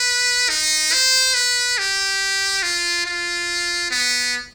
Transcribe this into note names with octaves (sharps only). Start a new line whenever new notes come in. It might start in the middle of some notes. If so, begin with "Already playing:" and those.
Already playing: B4
D#4
C5
B4
G4
F4
F4
B3